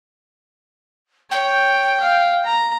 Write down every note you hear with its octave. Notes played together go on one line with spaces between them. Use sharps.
C#5 G5
F5
A#5